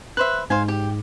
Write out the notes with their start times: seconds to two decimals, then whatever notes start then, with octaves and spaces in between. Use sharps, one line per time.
0.17 B4 C5 E5 F#6
0.50 G#2 C5 F5 G#5
0.68 G4